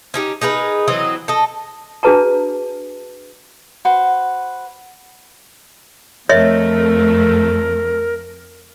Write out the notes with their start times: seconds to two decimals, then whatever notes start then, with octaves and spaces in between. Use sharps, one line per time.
0.14 C#4 D#4 G4
0.41 D#4 G#4 A#4 B4
0.88 E3 F#3 C4 D#5
1.28 A4 D#5
2.03 D4 F#4 G#4 B4 A5 A#5
3.85 F#4 B4 C5
6.29 F2 A3 A#4 C#5 D#5 E5